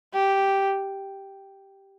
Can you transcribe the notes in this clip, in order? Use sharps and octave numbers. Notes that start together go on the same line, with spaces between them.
G4